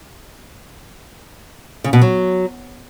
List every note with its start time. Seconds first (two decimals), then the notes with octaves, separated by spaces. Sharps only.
1.84 C#3
1.93 B2
2.02 F#3